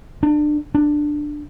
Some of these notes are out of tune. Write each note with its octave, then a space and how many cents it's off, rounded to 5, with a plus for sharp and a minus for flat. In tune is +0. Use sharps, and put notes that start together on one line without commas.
D4 +25
D4 +10